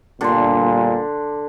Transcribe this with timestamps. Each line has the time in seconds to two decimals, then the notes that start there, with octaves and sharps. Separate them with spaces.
0.21 G1 G2 A#2 D3 C6